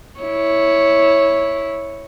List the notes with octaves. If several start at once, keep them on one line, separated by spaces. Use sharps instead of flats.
E4 C#5